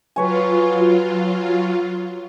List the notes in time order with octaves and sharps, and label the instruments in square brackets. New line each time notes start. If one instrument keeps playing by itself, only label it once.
[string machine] F#3 F4 [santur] B4 C#5 G#5